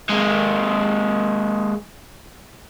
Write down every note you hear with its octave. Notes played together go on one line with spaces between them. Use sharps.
G#3 A#3